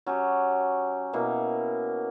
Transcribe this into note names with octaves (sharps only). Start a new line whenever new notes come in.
F#3 C#4 G4
B2 A#3 E4